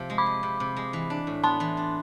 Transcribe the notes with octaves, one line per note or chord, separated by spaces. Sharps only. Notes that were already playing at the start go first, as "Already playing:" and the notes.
Already playing: C3 F3
G#3
B5 D6
F3
C3
C3
G#3
E3
D4
A2
B3 A5 C6
E3
D4